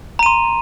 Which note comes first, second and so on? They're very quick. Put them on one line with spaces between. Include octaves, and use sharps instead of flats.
A#5 D#7 C6